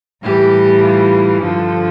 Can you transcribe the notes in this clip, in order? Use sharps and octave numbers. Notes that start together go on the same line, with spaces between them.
A2 E3 G3 G4
F4
G2 D3 F3 A4